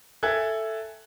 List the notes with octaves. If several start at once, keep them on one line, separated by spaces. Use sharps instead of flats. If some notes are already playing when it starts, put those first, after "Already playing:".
A4 E5 G5 G#5 F#6 G#6